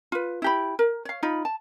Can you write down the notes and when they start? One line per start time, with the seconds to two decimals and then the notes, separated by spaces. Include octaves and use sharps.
0.12 F4 B4
0.42 E4 G4 B5
0.79 A#4
1.05 C#5 F5
1.23 D#4 F4 B5
1.45 A5